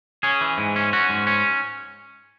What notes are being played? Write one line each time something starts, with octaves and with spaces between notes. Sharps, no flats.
C#4 G#4
E3
G#2
C#4
C#4 F#4
G#2
C#4